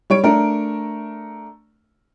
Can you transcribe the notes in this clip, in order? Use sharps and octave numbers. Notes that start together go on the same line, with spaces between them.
G3 C#5 D7
A3 D4 A#4